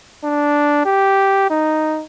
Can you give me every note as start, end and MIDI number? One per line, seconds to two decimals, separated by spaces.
0.24 0.84 62
0.85 1.45 67
1.50 2.03 63